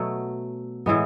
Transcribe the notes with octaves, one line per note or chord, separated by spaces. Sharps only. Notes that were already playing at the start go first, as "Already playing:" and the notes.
Already playing: B2 F#3 A3
A2 E3 G#3 B3